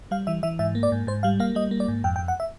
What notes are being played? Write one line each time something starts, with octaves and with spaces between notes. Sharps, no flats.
G3 F5
E3 E5
E3 E5
G#2 E5
A#3
D5
G#2
G#2 C5
G3 F5
A#3 F5
G3 D#5
A#3
D5
G#2
F2 G5
G5
F2
F#5
E5